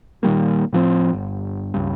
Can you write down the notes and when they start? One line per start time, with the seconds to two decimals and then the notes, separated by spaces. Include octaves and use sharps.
0.23 A#2 D#3 G3 A#3
0.72 A2 F3 C4
1.13 G1
1.74 C#2 G2